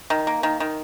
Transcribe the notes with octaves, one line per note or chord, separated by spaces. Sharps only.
D#3
A#3
D#3
D#3